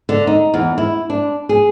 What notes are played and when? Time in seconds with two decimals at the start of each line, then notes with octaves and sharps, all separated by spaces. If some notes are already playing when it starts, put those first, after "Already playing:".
0.09 D3
0.27 D#4
0.54 E2
0.78 E4
1.10 D4
1.49 G#4